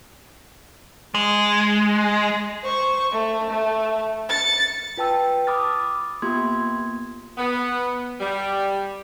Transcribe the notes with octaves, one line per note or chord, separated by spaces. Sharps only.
G#3
C5 C#6
A3
A3
A6 C#7
F4 B4 G5 A5 E6
B5 D6 D#6 F6 A6
A#3 B3 F4 G4 C6 G#6
B3
G3